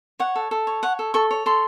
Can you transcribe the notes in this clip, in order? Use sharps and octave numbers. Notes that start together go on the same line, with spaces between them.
C#5 F#5
A4
A4
C#5
C#5 F#5
A4
A4 C#6
C#5
A4 C6